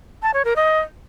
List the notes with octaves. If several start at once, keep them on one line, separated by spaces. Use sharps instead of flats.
A5
C#5
A#4
D#5